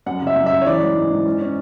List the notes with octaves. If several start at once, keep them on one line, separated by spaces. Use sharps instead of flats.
F#2 F#5
C#3 E5
F#2
E5
F#2
C#5
E3 D5
G#3
G#2
G#2
C#4
C#4